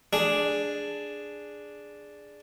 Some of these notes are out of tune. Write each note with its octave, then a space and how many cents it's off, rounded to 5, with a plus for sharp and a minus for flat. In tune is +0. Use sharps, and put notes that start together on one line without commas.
D4 +0 G#4 +0